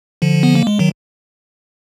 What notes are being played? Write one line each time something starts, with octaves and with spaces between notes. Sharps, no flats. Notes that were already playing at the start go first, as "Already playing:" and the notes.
D3 F3
B3
A#3
G#3
D#3 F#3